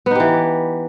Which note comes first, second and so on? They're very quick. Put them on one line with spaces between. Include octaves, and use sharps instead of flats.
B3 D#4 G4 E3